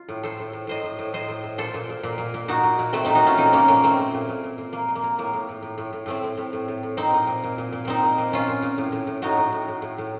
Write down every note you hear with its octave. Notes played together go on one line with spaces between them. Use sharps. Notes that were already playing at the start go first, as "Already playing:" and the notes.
Already playing: F4
A2
A2 A4 C5
A2
A2
A2 C5 D#5
A2
A2
A2 C5 D#5
A2
A2
A#2 A4 C5
A#2
A#2
A#2
A#2
A#2
A#2 D#4 F#4
A#2
A#2
A#2 A3 C4
A#2 C4 D#4
D#4 F#4
A#2 C#4 F4
A#2 C4 D#4
A#2 A#3 C#4
A#2 A#3 C#4
A#2 A3 C4
A#2
A#2
A#2
A#2
A#2
A#2 A#3
A#2
A#3
A#2
A2 A#3
A2
A2
A2
A2
A2
A2 A3 C4
A2
A2
A2
A2
A2
A#2 C4 D#4
A#2
A#2
A#2
A#2
A#2
A#2 C4 D#4
A#2
A#2
A#2 C#4 F4
A#2
A#2
A2
A2
A2
A2 D#4 F#4
A2
A2
A2
A2
A2